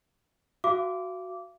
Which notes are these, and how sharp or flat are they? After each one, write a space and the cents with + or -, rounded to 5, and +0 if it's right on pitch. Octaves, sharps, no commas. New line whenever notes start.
F#4 +0 F5 -40 D6 -15